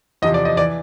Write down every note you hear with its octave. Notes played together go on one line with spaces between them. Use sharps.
E2 C3 F3 D#5
D5
D#5
E3 D5